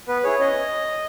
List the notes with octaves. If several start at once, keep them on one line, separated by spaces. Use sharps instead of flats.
B3 B4
E4 G#4 C#5
C#4 D#5